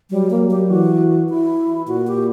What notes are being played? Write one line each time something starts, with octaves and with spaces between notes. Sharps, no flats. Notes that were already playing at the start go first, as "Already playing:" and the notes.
F#3 G3
A#3
G4
E3 F#4
E4
A#2 F#4
G4